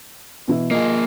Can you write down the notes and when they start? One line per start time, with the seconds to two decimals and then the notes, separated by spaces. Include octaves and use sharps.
0.48 B2 E3 E4
0.71 A#3 F4 G#4 D#5